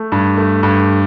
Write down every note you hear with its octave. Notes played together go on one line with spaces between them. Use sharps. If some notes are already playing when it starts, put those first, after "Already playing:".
Already playing: A3
G2
A3
G2